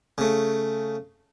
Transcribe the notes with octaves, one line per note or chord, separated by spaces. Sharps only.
C#3 A3